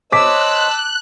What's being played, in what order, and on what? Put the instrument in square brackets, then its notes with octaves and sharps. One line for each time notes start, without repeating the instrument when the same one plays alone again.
[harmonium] C5 C#5 D#5 [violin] A5 E6 [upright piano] D6 B6 [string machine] F#6